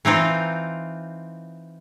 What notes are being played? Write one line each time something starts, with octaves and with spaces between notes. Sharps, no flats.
E3 C4 D#4 F4